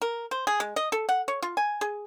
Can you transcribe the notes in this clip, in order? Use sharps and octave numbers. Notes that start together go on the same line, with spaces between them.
A#4
C5
G#4
G#3
D#5
A4
F#5
C#5
F4
G#5
G#4